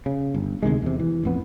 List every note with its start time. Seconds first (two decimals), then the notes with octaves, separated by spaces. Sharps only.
0.06 C#3
0.34 G1
0.63 D2 C3 D#3 G#3
0.82 E2 C3
0.99 E3
1.23 A1 F2 B3